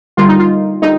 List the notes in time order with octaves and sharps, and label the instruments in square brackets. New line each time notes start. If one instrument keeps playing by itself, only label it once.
[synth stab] D3 G3 A#3 F4
D#4
F4
D3 G3 A#3 D#4